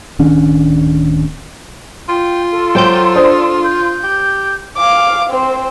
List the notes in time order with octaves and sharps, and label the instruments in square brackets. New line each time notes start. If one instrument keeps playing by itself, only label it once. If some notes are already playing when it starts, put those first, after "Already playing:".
[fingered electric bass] D1 D#3 C#4 D4
[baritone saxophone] F4 [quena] G5
[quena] A4
[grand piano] F#3 C5 C6 [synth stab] G5 D6 G6
[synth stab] D4 C5 [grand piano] D#6
[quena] G6
[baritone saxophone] G4
[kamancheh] F5 D6
C4 C5